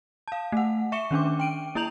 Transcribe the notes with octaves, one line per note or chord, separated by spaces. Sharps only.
F5 A5
A3 F#5
E5 C#6 C#7 E7 G7
D#3 C#4 D4 D6
G5 D7 D#7
A#3 E4 A#5 G6 F7 F#7